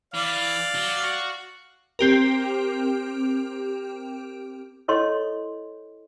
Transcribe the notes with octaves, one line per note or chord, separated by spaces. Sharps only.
E3 D5 F5
F#3
F#4
C4 G4 A#4
E4 A4 C#5 D#5 C6